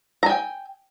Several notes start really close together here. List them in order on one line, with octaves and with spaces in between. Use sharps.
A#5 G#5 G5